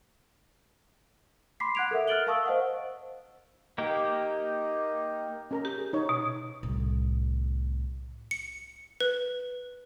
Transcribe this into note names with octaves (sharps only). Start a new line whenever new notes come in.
B5 C6 D6 B6 C7
F#5 F#6 G#6 D7 F7
A4 A#4 E5
F6 F#6 A6 D7 F#7 G7
A#4 F5 A5 C#6 D#6 E6
C5 D#5 F5 F#5
A#3 D#4 G4
C#4 A#4 A#5
G4
G#4
D#4 C#5
B2
C2 A2
C#7
B4